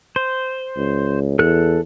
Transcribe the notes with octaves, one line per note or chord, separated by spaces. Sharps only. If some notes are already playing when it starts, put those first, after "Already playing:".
C5
C#2
E2 A4 F#6